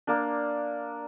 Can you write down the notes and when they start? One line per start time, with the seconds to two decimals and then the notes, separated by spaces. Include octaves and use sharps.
0.07 A#3 D4